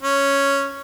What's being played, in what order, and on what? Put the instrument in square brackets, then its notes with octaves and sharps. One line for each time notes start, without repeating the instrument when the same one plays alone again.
[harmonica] C#4